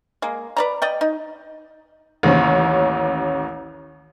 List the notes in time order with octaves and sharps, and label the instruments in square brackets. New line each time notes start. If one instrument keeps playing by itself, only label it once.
[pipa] G#3 A#3
B4 D5 A#5
D5 D#5 G5
D#4
[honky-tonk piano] A1 D#2 C#4